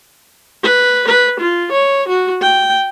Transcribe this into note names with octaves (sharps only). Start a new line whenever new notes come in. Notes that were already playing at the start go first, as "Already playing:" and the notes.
B4
B4
F4
C#5
F#4
G5